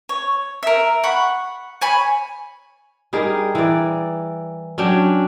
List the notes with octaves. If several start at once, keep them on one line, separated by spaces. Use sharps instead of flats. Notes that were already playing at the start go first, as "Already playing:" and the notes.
C#5
A#4 E5
F#5 B5 C#6
C#5 G#5 B5
G3 D#4 G#4 A#4
E3 A#4 D5
F#3 C#4 D4 G5